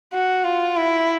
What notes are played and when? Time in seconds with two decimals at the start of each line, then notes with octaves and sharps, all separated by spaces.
0.14 F#4
0.44 F4
0.77 E4